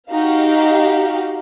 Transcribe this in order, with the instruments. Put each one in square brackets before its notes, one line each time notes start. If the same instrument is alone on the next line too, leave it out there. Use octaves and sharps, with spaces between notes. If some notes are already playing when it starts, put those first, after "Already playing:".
[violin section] D#4 F#4 G4 F5